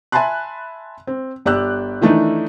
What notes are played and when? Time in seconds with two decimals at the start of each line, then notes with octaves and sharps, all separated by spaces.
0.12 E5 G#5 A5 B5 C6 F#6
1.07 C4
1.46 G1 G4 D5 E6 F#6
2.02 D#3 E3 A3 D4 D#4